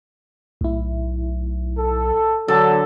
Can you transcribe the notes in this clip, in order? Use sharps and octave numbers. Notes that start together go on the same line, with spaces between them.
B1 A2 E4
A4
D3 F#3 A4